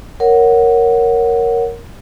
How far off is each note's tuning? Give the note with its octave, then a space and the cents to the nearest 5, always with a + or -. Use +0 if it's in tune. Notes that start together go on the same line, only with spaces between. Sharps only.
A#4 +0 C#5 +0 F#5 +0